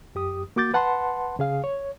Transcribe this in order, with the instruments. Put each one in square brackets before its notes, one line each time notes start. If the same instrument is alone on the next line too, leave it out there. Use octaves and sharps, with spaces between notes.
[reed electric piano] F#2 G4 D#6
A#3 F#4 D6 G6 A6
B4 F#5 A5 B5 C6
C#3 G#4 F5
C#5